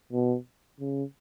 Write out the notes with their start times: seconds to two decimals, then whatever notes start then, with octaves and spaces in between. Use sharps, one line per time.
0.13 B2
0.80 C#3